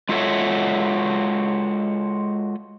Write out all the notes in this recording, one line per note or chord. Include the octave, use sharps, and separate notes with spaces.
G#3 F4 F#4 A4 C#5 E5